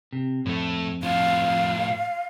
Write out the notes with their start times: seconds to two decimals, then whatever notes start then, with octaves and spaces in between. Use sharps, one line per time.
0.13 C3
0.46 F2 A2 A3
1.03 A2 F3 F5